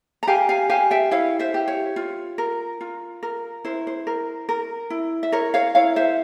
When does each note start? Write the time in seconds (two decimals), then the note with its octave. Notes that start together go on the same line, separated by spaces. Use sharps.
0.23 A#5
0.27 G4 F5 G#5
0.49 F5 G#5
0.70 G4 F5 G#5
0.91 E5 G5
1.11 E4 C#5 F5
1.39 C5 E5
1.54 G4
1.68 C#5
1.96 F4
2.38 A#4
2.81 F4
3.23 A#4
3.64 E4 C5
3.87 C5
4.07 A#4
4.49 A#4
4.90 E4
5.23 E5
5.32 A#4 C#5
5.54 C#5 F5
5.75 E4 C#5 F5
5.96 C5 E5